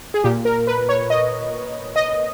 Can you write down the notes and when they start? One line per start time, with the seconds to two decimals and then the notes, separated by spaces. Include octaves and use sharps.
0.14 G#4
0.24 A#2 G4
0.45 A#4
0.67 B4
0.89 C#5
1.10 D#5
1.96 D#5